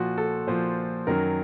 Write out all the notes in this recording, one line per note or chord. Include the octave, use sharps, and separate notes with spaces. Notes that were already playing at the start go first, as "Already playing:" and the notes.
Already playing: A#2 F3 F#4
A4
A#2 F3 C5
F#2 D#3 F#3 A#4